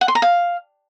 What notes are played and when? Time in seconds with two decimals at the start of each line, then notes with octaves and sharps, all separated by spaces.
0.01 F#5
0.08 C6
0.15 A#5
0.22 F5